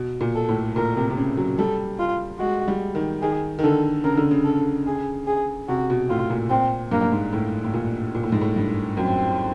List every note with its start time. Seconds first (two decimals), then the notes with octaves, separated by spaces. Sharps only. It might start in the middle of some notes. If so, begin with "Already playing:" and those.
Already playing: B2
0.21 A#2
0.35 A4
0.49 A2
0.76 A#2 A#4
0.96 C3
1.10 C3
1.17 C#3
1.37 F#3
1.58 G3 A4
1.99 F4
2.40 G#3 F#4
2.68 G3
2.95 D#3
3.22 D#3 G#4
3.59 D#3
3.63 D3 A4
4.04 C#3 A#4
4.17 D3
4.31 C#3
4.45 A4
4.87 G#4
5.27 G#4
5.69 C3 F#4
5.90 B2
6.09 A2 F4
6.30 A#2
6.50 A#2 C4
6.91 G2 A#3
7.02 G2
7.12 G#2
7.33 A2
7.64 A2
7.73 A#2
8.15 A#2
8.23 A2
8.32 G#2
8.41 A2
8.56 G2
8.97 F#2 C4